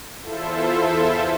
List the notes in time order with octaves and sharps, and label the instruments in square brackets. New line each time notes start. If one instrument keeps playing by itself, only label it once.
[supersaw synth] E2 E4 F4 A4 C5 E5